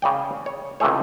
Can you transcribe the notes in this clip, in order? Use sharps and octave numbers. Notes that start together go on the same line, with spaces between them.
C#3 D5 G5
C#5
C#2 C3 E3 A3 G#4 C#5